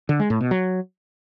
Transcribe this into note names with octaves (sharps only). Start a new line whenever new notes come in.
D3
G#3
A2
B2
F#3